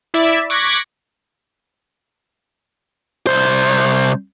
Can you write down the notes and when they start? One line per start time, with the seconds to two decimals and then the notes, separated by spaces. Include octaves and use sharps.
0.14 E4 D5 E5
0.50 C#6 D6 F#6 G#6 A#6 B6
3.27 C2 C5